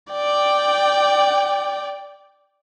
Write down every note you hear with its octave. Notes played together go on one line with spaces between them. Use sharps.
D5 G5